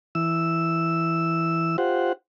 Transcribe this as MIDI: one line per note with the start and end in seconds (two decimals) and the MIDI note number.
0.15 1.77 52
0.15 1.77 88
1.78 2.13 65
1.78 2.13 67
1.78 2.13 72
1.78 2.13 78